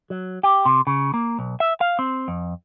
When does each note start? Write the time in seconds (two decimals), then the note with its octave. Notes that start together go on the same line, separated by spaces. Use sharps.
0.10 F#3
0.43 G4
0.65 C3
0.87 C#3
1.14 A#3
1.39 B1
1.60 E5
1.81 F5
1.99 C4
2.28 F2